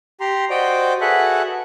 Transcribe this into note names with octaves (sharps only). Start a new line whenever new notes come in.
G4 A#5 C6
F#4 C5 D5 D#5 G5 D6
F#4 G#4 A4 B4 E5 F#5